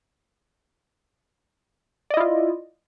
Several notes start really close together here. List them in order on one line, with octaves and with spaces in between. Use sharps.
D5 D#5 E4 F4